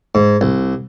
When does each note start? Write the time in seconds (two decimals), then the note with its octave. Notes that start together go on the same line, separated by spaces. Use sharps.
0.15 G#2
0.41 C2